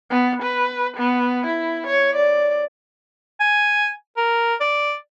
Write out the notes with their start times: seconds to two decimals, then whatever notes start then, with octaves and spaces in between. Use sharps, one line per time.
0.10 B3
0.42 B4
0.97 B3
1.46 E4
1.87 C#5
2.16 D5
3.40 G#5
4.17 A#4
4.60 D5